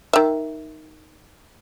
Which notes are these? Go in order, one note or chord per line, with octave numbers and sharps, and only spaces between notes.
D#3 E5